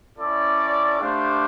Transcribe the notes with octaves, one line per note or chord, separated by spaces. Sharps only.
C#4 E4 A4 D5
A3 D4 G4 C5 F5